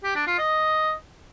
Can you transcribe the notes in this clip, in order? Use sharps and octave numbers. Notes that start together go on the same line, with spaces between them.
G4
D4
F4
D#5